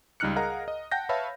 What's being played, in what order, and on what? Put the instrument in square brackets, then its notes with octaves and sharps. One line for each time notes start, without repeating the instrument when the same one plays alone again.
[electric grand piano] C#2 G3 D#4 F6 F#6 C#7
G#4 A#4 D#5 F5 F#5 A#5
D#5
F#5 G5 A5 G6 A#6
B4 C#5 E5 F5 A5 B5